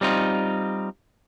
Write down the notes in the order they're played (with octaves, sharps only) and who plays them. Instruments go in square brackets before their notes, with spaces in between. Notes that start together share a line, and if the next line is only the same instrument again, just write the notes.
[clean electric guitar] G3 C4 D#4 F4